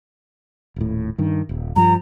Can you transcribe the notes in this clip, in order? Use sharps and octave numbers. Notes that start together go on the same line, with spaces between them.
D#1 A2
G2 D#3
D#1
G2 F3 A#5